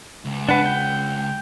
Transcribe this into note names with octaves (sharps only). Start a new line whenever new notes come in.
C#2
D4 B4 F#5
G5